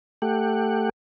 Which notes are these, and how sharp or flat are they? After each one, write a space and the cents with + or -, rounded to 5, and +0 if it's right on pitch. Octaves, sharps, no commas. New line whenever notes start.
A3 +15 G4 +15 F#5 +0